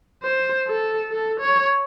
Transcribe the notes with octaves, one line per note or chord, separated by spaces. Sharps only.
C5
A4
A4
C#5